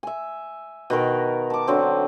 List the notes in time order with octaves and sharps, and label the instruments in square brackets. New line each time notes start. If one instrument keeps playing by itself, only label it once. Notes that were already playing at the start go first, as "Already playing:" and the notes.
[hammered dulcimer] E5 G#5
B2 D#3 A#4
A5 D6
D3 F#3 C4